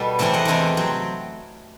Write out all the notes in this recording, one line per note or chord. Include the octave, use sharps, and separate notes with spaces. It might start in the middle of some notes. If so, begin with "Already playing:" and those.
Already playing: B2 G3 B3 G4 A4
E2 C3 E3 A3 C4 C5 E5
D#5 F#5
E2 C3 E3 A3 C4
F#3 C4